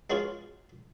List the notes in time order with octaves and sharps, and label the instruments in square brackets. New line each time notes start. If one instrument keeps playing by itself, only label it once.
[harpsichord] G#3 B3 C#4 F4 F#4 G#4